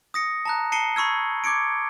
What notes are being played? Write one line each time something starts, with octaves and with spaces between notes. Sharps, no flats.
D#6 A#6 C#7
A5 A#5 F#6
A5 C7 C#7 D#7 G7
B5 C#6 E6 G#6
C#6 D6 G#6 C#7 D7